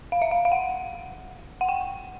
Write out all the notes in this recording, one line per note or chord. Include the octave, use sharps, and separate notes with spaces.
F5
E5
F5
F5
F#5
F#5
G5